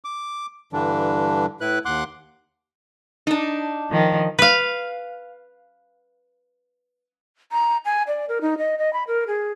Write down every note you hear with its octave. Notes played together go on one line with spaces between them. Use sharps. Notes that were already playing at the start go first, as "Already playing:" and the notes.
D6
G2 D3 E3 G3 D4
A2 E4 B4 F#6
D#2 F#5 C6 D6 F#6
D4 D#4
D#3 F3
B4 F5
A#5
G#5
D5
A#4
D#4
D#5
D#5
B5
A#4
G#4